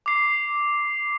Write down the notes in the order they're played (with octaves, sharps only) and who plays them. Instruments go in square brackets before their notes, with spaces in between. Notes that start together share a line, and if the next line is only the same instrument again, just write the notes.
[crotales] D6 C7